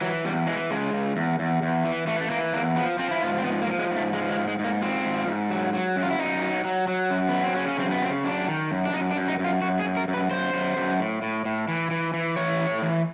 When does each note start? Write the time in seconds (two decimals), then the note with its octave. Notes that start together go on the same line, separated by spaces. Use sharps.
0.01 E3 F#3
0.25 E2 G3
0.47 E3 G#3
0.71 C#3 G#3
0.93 C#3
1.16 E2
1.39 E2
1.62 E2
1.85 E3
2.07 E3 A3
2.21 A3
2.30 E3 A#3
2.53 E2 A#3
2.76 F3 B3
2.99 F3 C4
3.11 E4
3.22 G#2 F4
3.38 C4
3.44 F3 B3
3.62 A#3
3.67 F3
3.79 G#3
3.91 G#2
3.96 A3
4.13 F3 G#3
4.30 G#3
4.36 G#2
4.48 G#3
4.59 G#2
4.64 A#3
4.82 F3 C4
5.05 G#2
5.28 G#2
5.50 F#3
5.73 F#3
5.96 F#2
6.03 F4
6.11 E4
6.19 F#2 D#4
6.42 F#3
6.64 F#3
6.88 F#3
7.10 F#2
7.29 F#3 B3
7.43 C4
7.56 C#3 C#4
7.68 C#4
7.79 F#2 C4
7.92 B3
8.02 C#3 C4
8.24 F#2 D4
8.48 D#3
8.71 F#2
8.85 D4
8.94 F#2 D#4
9.11 D4
9.16 F#2
9.28 D#4
9.39 F#2
9.45 F4
9.62 F#2 F#4
9.79 G#4
9.85 F#2
9.97 A#4
10.08 F#2
10.14 B4
10.31 F#2 C5
10.53 F#2
10.77 F#2
11.00 A2
11.22 A2
11.45 A2
11.68 E3
11.91 E3
12.14 E3
12.36 E3 C#5
12.60 A2
12.83 E3